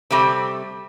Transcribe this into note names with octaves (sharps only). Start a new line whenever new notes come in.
C3 G3 A3 C4